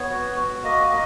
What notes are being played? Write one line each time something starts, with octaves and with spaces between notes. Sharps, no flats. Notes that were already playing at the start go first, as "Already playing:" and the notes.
Already playing: B3 C#5
F#4
F#4
A#3 D#5
A#3 D#5